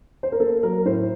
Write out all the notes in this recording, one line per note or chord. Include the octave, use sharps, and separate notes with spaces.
C5
A#4
A#3 A4
F#3 A#4
A2 C5